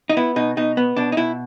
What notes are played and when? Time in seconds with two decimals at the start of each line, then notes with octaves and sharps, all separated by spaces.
0.09 D#4
0.17 B3 E4
0.36 B2 D#4
0.57 B2 D#4
0.77 B3
0.97 B2 D4
1.12 D#4
1.17 B2 E4